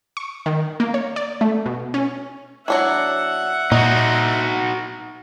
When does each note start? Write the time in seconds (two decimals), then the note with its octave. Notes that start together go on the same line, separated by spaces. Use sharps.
0.17 C#6
0.46 D#3
0.80 A#3
0.94 C#5
1.16 D5
1.41 A3
1.66 B2
1.94 C#4
2.68 F#3 D4 E4 E5 F#5
3.72 A#2 D#4 F#4 D#5